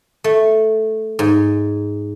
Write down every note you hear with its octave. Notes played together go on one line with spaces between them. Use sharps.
A3
G#2